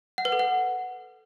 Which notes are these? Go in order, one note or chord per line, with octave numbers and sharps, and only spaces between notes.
F#5
B4
A4
F#5